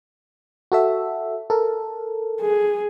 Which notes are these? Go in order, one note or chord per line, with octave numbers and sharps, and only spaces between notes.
F#4 A4 E5
A4 A#4
G#4